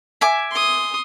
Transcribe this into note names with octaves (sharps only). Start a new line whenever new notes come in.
E5 G#5 D6
C6 D#6